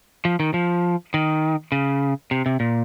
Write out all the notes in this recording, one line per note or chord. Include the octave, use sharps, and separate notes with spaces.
F3
D#3
F3
D#3
C#3
C3
C3
A#2